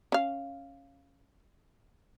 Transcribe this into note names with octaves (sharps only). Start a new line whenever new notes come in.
C#4 F5